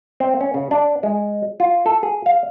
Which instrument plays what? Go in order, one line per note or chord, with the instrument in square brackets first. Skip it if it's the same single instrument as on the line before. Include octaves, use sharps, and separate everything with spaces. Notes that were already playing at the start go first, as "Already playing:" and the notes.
[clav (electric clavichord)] C4
C#4
C#3
D4
G#3
F4
A4
G#4
F5